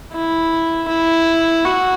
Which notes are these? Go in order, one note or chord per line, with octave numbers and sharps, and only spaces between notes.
E4
E4
F#4